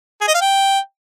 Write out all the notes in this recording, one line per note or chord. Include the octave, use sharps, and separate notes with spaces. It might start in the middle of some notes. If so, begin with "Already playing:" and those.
G#4
D#5
F5
G5